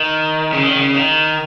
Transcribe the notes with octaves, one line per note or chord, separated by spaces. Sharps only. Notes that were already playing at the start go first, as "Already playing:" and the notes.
Already playing: D#3
C#3
D#3
C#3
D#3